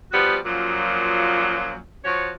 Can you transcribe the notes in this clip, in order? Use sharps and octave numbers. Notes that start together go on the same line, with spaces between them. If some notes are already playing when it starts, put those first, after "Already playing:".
F3 G3 B3 F#4
F#2 A#2 F3 F#3
F3 F#4 C#5